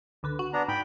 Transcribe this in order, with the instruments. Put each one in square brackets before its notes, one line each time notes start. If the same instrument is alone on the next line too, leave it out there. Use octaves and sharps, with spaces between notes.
[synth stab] C#2 D3 B4
F#4
[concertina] B3 D4 A#5
[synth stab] G#2 [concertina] G5 B5